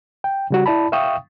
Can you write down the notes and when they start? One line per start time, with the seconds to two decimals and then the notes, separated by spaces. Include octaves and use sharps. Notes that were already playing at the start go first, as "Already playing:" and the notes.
0.24 G5
0.50 C#3 G3 F#4
0.66 E4 D5 A5 B5
0.92 E5 F5 G5 C#6 D#6